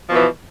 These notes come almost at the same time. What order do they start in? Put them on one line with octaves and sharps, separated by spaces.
F3 B2 E3